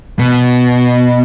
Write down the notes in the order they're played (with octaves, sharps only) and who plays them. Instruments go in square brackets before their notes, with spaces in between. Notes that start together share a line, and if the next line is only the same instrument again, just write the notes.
[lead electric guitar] B2